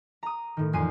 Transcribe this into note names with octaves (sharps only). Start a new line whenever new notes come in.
A#5 D#6
A2 D#3
E1 F2 G#5 C6 D#7